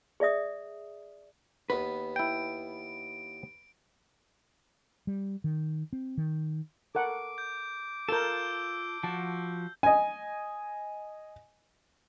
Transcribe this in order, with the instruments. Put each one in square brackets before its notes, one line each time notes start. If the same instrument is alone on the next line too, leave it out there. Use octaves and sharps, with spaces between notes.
[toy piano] G#4 D5 E5 D#6
[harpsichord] D#2 B3 [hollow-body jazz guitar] B4
[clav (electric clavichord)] E4 G5 [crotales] D7
[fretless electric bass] G3
D#3
C4
D#3
[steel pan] A4 A#4 F#5 [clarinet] D6
[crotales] G6
[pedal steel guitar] F4 A5 [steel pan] A4 A#4 [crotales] E6 G6
[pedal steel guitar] F3 F#4 [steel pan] A5
[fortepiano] D#5 G#5